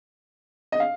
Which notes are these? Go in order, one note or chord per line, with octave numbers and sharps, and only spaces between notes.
D#5
F5